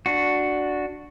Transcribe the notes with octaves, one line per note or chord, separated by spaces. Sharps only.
D4 F#4